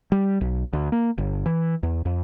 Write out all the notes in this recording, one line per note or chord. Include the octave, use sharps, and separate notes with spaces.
G3
B1
D2
A#3
G1
E3
E2
F2